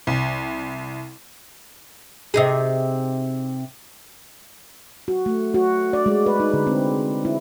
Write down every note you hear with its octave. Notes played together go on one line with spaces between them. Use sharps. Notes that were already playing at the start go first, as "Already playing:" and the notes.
C2
C3 D#4 G#4
F#4
A3
F#4
D5
G#3
B4
D#4
D3
C4
E4